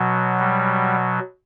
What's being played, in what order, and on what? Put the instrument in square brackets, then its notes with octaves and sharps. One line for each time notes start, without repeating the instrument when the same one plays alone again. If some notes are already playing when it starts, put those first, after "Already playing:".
Already playing: [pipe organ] B2 F#3
G3